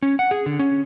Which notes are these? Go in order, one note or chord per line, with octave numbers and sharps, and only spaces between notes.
C#4
F#5
G#4
D3
C#4